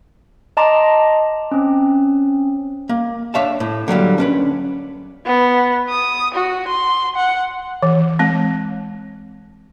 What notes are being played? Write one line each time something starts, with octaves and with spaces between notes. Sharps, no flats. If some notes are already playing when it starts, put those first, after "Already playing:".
D#5 A5 A#5 C6 D6
C4 C#4
A#3
D4 C#5 E5 F5 A5
A2
D3 F#3 G3 A#3
C#4 D4 B4
B3
D#6
F#4
C6
F#5
E3
G#3 C4